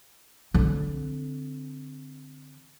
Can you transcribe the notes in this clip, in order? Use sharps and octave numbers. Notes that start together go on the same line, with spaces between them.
D3 C4